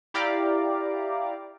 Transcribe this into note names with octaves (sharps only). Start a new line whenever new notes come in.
E4 G4 D5 F5 A#5 D6